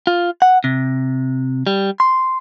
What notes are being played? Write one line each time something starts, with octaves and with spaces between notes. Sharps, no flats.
F4
F#5
C3
G3
C6